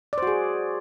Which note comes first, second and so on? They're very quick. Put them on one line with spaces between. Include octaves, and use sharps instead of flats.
D5 C5 F#4 G#4